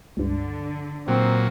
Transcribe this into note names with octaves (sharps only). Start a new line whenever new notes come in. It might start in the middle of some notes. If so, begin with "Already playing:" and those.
C#2 G2 D3
A#2 F#3 C4